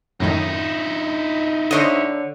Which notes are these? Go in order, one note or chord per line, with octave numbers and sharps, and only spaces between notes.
F#2 A2 D#3 D#4 E4
D3 C5 C#5 D#5